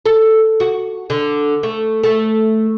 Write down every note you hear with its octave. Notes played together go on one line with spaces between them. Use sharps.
A4
F#4
D3
A3
A3